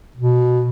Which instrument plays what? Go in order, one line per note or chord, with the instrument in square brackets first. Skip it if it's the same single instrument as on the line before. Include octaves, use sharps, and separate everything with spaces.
[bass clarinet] B2